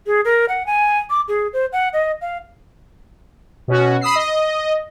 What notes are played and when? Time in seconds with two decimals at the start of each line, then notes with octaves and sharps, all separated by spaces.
0.07 G#4
0.25 A#4
0.49 F#5
0.67 G#5
1.10 D6
1.28 G#4
1.53 C5
1.73 F#5
1.93 D#5
2.21 F5
3.68 B2 C#4 F#4
4.01 B5 D#6 E6 C7
4.16 D#5